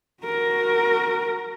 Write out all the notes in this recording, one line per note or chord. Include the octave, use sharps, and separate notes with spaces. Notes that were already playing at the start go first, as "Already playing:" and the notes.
F#4 A#4